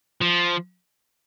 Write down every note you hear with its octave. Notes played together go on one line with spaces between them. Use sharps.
F3